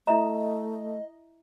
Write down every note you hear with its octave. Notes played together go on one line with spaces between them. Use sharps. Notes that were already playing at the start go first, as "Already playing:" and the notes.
A3 E4 D#5 E5 A#5